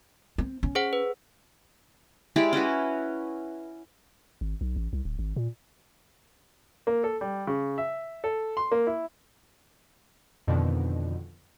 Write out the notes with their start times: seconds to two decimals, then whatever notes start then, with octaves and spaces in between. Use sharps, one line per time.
0.38 C4
0.63 C#4
0.75 G#4 C5 F#5
0.93 B4
2.36 G#3 E4 G4 D5
2.53 C#4 E4 F#4 B4
4.41 G#1
4.61 B1
4.76 A1
4.93 C2
5.05 D1
5.19 G#1
5.36 A#2
6.87 A#3
7.04 A4
7.21 G3
7.47 C#3
7.78 E5
8.24 A4
8.57 C6
8.72 A#3
8.87 E4
10.48 F2 B2 D3 D#3